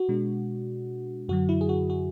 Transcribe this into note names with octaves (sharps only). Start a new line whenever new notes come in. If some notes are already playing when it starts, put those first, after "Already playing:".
Already playing: F#4
B2 G#3 D4
F#2 D3 F#3 F#4
E4
G#4
F#4
F#4